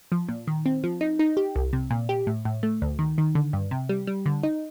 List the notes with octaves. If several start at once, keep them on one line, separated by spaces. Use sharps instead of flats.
F3
A#2
D#3
C4
F3
D#4
D#4
G4
C2
C3
A#2
G4
A2
A2
A3
D2
D#3
D#3
D3
G2
C3
G3
G3
D3
D#4